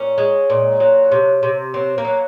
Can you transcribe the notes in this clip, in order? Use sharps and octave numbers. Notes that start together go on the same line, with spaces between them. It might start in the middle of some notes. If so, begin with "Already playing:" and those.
Already playing: A#2 C#4
G#3
A#2
F#3
C3
C3
F#3 C4
A#3
F#3